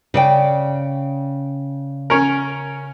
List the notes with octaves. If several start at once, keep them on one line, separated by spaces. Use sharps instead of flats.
C#3 D5 G5
C#4 A#4